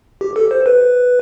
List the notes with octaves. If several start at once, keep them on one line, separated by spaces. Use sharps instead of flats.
G4
A4
C5
B4